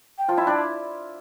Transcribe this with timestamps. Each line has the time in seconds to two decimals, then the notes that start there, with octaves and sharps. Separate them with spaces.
0.18 G5
0.28 F3 F4
0.37 E4 E5
0.47 D4 D5